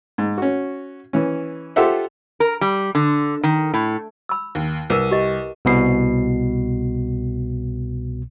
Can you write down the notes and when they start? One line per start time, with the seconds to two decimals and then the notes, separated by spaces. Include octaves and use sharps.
0.18 G#2
0.38 C#4 F#4
1.13 E3 C#4
1.76 F4 G4 A4 C5 E5 F#5
2.40 A#4
2.61 G3
2.95 D3
3.43 D#3
3.74 A2
4.29 B5 E6
4.55 D#2
4.90 C2 A#4 B4 D#7
5.11 G4 D#5
5.65 C2 B2 C7